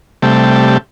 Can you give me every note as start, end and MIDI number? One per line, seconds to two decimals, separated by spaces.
0.22 0.78 48
0.22 0.78 55
0.22 0.78 57